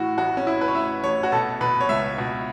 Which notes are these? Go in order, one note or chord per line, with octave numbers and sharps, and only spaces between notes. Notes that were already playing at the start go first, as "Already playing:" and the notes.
Already playing: A2 E3 F#4
A1 F#4
C#4
A1 E4
B4
C#5
A2 E5
A1 C#5
F#4
B2 A4
B2 B4
C#5
C#2 E5
B2